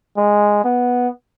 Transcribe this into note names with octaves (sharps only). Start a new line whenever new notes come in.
G#3
B3